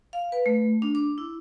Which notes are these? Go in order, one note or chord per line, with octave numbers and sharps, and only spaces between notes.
F5
B4
A3
D4
D6
E4